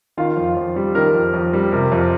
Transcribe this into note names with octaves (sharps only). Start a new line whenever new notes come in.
D#3 F4 F5
F2
F2
G3
D#3 A#4
F2
F2
G3
C3 A#4
F2